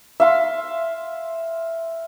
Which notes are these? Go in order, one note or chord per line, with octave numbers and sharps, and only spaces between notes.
E5 F5 C6